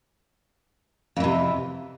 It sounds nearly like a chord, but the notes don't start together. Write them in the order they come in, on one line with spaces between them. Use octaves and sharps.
F2 E3 C3